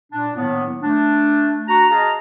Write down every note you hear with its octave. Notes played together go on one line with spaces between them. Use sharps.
A#2 D4
A2 D#3 F#3 A#3 B3
A3 D4
F#4 A#5
G#4 D#5 F5 A5 A#5